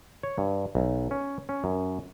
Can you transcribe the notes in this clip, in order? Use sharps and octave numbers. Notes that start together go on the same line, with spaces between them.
C#5
G2
B1
C#4
C#4
F#2